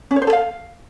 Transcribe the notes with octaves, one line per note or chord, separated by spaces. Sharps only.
C#4
C#5
C5
A4
F5